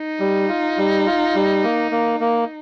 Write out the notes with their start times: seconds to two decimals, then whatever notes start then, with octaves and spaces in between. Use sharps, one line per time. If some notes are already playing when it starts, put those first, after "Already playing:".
Already playing: D#4
0.20 G3
0.48 F4
0.78 G3
1.06 F4
1.35 G3
1.64 A#3
1.91 A#3
2.20 A#3